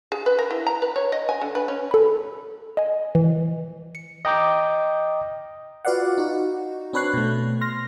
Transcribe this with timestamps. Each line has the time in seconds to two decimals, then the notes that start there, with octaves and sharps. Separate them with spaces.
0.12 G#4
0.26 B4
0.39 A#4
0.51 E4
0.67 A#5
0.82 B4
0.96 C#5
1.12 D#5
1.29 G#5
1.41 D3
1.55 B4
1.68 C#4
1.91 A4 B5
2.77 D#5 G#5
3.15 E3
3.95 C#7
4.25 D#5 G5 A#5 D6 G6
5.85 F4 F#4 B4 D5 F5 F#5
6.18 D#4 F#4
6.93 C4 D4 B4 C#5 F#6 C7
7.14 B2 A3
7.61 C6 F6 A#6